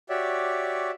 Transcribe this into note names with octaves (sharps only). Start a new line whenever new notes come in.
F#4 G4 C#5 D5 E5